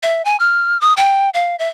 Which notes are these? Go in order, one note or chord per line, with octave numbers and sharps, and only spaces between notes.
E5
G#5
F6
D#6
G5
F5
E5